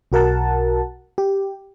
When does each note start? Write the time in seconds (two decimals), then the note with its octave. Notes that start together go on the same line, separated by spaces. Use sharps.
0.12 B1 F#4 A#4 F#5 A5
1.18 G4